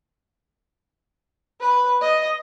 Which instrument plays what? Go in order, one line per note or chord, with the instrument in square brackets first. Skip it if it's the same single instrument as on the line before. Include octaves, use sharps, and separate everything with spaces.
[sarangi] B4
D#5